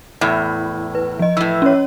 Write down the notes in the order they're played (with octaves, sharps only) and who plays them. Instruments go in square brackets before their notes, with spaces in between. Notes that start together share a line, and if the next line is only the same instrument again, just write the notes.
[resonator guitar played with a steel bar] E2 A2
[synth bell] B4
F3 D#5
[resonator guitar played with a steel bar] A2 E3 [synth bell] E6
[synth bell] C#4 C#5